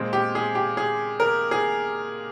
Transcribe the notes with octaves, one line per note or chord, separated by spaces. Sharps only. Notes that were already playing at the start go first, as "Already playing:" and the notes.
Already playing: A#2 G#3 C4
G4
G#4
G4
G#4
A#4
G#4